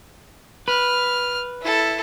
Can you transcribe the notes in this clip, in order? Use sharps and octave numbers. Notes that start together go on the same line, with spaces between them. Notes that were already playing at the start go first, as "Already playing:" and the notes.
B4 F6
E4 A4